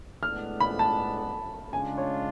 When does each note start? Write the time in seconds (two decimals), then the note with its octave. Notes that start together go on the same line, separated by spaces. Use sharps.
0.22 A2 G#3 B3 D4 F6
0.60 B5
0.79 A5
1.72 C#3 G#3 D4 F4 G#5
1.98 C#5